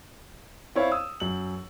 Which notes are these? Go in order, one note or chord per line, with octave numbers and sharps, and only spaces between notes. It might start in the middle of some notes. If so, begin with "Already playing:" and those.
C4 E4 C#5 D5 F5
D#6 E6
F#2 F#7